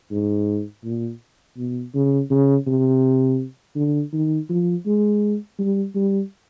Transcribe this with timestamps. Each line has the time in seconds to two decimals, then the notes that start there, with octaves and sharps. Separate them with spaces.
0.11 G#2
0.85 A#2
1.57 B2
1.95 C#3
2.31 C#3
2.67 C3
3.76 D3
4.13 D#3
4.50 F3
4.86 G#3
5.59 G3
5.95 G3